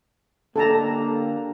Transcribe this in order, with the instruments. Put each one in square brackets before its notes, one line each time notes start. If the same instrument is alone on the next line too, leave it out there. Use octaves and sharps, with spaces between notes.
[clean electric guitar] D3 D4 G4 [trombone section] A#3 [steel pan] A4 A5 A#5